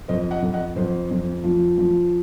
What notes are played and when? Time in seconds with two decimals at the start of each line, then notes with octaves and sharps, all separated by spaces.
0.08 F2 C5 D#5
0.31 D#5 F#5
0.42 F2
0.53 D#5 F#5
0.76 F2 C5
1.11 F2
1.44 F3
1.78 F3